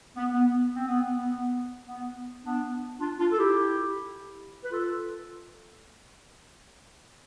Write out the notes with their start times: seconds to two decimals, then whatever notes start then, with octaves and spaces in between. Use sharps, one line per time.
0.17 B3
0.32 B3
0.74 C4
0.88 B3
1.15 B3
1.87 B3
2.43 B3 D4
3.00 D4 F4
3.19 D4 F4
3.31 A4
3.38 E4 G4
4.64 B4
4.71 F4 A4